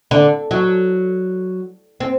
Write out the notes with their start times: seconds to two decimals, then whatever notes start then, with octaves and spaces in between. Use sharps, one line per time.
0.11 D3
0.51 F#3
2.00 C4